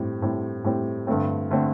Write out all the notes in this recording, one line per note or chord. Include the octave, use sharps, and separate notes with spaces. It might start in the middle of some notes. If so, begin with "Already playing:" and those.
Already playing: A2 G3 C4
A2 G3 C4
A2 G3 C4
G2 D3 A3 C4
D3 A3 C4